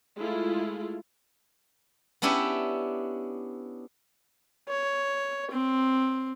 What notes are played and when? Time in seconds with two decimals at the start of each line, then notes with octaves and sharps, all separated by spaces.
0.17 G#3 A3 E4 F4
2.22 B3 C#4 D4 E4 G4
4.69 C#5
5.51 C4